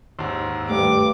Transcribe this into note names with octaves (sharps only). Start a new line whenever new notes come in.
D#2 G#2 C6 E6
G2 A3 B4 D6